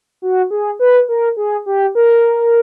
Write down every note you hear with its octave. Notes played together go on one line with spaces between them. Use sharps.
F#4
G#4
B4
A#4
G#4
G4
A#4